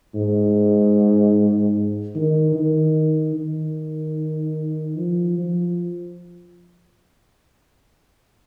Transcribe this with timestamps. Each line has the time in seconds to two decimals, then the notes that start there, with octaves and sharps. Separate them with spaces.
0.15 G#2
2.15 D#3
2.55 D#3
3.36 D#3
4.97 F3
5.38 F3